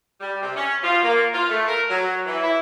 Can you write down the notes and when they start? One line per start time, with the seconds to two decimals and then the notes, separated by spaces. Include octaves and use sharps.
0.20 G3
0.41 C3
0.55 C#4
0.83 F4
1.02 A#3
1.33 F4
1.49 A3
1.68 A#4
1.89 F#3
2.26 E3
2.42 E4